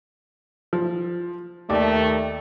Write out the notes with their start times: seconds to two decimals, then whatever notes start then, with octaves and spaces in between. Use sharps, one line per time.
0.73 F3
1.70 D#2 D#3 A3 D5